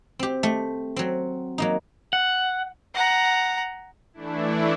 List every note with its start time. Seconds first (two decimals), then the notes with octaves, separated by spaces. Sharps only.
0.19 C4 G4
0.43 A3 G4
0.96 F#3 C4
1.58 F#3 A#3 D#4
2.13 F#5
2.94 F#5 A#5
4.13 E3 A3 D4 E4